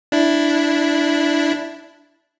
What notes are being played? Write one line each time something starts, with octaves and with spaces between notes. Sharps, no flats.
D4 E4